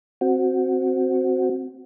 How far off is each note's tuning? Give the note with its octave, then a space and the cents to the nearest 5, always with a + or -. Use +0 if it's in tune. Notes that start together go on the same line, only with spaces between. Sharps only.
C4 +0 F#4 +0